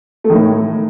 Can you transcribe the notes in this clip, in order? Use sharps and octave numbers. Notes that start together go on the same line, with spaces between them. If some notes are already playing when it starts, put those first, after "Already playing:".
A3
D#3
A2